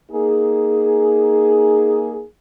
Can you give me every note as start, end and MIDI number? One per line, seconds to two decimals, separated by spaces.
0.11 2.23 58
0.11 2.23 63
0.11 2.23 68